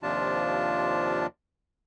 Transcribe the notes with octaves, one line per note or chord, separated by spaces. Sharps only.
D#2 C3 F3 D4 F4 A5